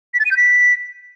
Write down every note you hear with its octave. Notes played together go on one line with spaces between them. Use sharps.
B6
A6
D#7
G6
B6